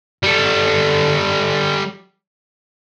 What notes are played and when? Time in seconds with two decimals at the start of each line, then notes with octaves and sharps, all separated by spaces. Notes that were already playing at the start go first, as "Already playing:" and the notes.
0.23 G3 A4